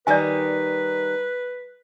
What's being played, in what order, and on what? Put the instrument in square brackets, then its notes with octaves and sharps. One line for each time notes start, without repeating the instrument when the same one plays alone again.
[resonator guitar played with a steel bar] D#3 G3 D#4 [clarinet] B4 [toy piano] D5 G#5